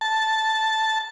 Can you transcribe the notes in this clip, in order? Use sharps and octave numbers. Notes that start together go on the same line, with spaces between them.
A5